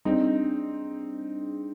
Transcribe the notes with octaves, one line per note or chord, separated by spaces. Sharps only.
G3 C4 D4 D#4 G#4